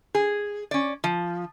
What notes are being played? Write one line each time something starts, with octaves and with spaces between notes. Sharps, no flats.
G#4
C#4 D5
F3